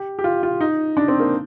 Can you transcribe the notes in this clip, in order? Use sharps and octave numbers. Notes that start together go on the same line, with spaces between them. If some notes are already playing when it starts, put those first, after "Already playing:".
Already playing: G4
G4
F4
F4
D#4
D4
C4
A#3